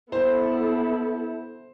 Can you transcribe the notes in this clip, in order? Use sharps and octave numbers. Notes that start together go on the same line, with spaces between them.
B3 E4 A4 C5